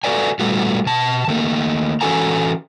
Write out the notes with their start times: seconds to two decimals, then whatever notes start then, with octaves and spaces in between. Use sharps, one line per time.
0.04 F#4 A4 B4 D5 G#5
0.39 A#2 G3 A3 B3 F4 F#4
0.86 B2 A5
1.28 D#3 A3 A#3
2.01 E3 C#4 F#4 A4 G#5 A#5